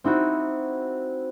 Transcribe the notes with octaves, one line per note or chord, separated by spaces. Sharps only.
C4 D#4 E4 F#4